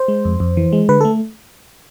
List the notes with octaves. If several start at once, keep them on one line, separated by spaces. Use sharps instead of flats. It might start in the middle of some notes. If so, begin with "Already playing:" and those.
Already playing: C5
G#3
F2
F2
E3
G#3
D3 B4
A3 A4